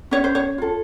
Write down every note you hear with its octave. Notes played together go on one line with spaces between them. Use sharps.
C#4 C#5
C5
C#5
F4 A4